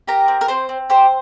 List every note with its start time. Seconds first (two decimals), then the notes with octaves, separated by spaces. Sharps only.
0.08 G4 A#4 A#5
0.28 C4
0.41 A#4
0.48 C4 C5
0.69 C4
0.90 G4 C5